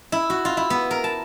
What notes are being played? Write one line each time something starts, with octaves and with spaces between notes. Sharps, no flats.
E4
F#4
F4
E4
B3
A#4
A5